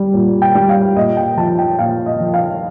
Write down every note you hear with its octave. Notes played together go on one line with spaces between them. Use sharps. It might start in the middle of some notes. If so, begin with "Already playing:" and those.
Already playing: G3
A#2
G5
G3
F5
A#2 D#5
G5
F3 A5
G5
A#2 F5
D#5
F3
F5